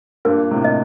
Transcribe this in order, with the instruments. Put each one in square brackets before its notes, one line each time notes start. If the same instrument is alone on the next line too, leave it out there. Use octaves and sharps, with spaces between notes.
[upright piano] G2 A#2 [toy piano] A#4
[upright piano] A2 C3
[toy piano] D#5